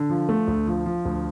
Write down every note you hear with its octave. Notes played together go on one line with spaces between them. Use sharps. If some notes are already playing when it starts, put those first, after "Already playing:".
Already playing: D3
F3
A3
D2
F3
F3
D2